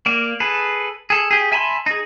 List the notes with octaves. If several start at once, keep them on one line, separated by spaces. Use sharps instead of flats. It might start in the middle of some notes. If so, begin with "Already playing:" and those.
A#3 D5 F5
G#4 A4 B4
G#4 A4
G4 G#4
E5 G#5 A5 B5 C6
D#4 G#4